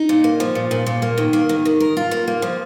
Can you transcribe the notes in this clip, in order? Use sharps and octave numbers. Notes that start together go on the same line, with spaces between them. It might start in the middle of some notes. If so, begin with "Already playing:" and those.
Already playing: D#4
A#2
A#3
F3
A#2
A#2
A#2
A#3
D#3
A#3
D#3
D#3
A#4
F4
A#3
A#3
F3